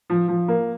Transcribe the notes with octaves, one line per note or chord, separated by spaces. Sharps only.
F3
F3
A#3